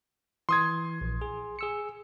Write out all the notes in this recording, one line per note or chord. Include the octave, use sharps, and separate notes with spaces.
E3 C6 D#6 G#6
A#1
G#4
G#4 E6 C#7